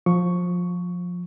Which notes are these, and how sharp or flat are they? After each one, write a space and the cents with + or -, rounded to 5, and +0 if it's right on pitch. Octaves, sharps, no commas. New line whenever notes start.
F3 +20 C#6 +5